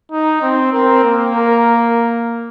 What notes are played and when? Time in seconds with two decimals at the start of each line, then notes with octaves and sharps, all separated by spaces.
0.11 D#4
0.42 C4
0.73 C4 A#4
1.04 A#3
1.35 A#4